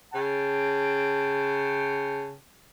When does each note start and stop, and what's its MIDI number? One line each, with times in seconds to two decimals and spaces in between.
0.13 2.34 49
0.13 2.34 79
0.13 2.34 81